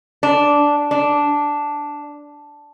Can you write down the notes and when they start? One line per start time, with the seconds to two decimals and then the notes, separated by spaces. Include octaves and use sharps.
0.23 D4
0.91 D4